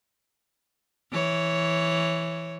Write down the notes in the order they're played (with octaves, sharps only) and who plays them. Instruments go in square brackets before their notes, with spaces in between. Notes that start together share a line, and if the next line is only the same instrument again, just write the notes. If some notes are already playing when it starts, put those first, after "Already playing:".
[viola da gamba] E3 C#5